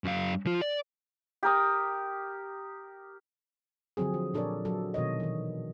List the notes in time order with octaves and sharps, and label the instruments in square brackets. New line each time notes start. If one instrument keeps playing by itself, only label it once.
[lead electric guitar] F#2 F5
F3 F4
D5
[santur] G4 A#4 D#6
[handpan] D3 F3 F#3 C4 G#4
F3
A#2 D4 A4 A#4 C#5 D5
F#3 A4
B2 D#3 C#5 D#5
D#3 E3